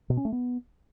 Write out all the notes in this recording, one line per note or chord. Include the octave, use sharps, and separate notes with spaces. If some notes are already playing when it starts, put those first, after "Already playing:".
B2
C#4
A3
B3